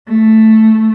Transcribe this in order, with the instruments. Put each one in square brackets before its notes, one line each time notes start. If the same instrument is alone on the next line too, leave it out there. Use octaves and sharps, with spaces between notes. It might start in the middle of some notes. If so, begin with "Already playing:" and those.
[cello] A3